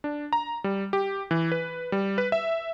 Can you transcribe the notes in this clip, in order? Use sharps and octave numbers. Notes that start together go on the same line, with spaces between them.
D4
A#5
G3
G4
E3
B4
G3
B4
E5